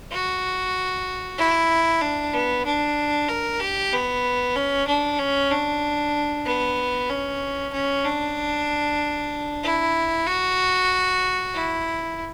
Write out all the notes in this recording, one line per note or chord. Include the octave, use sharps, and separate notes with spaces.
F#4
E4
D4
B3
D4
A#4
G4
B3
C#4
D4
C#4
D4
B3
C#4
C#4
D4
E4
F#4
E4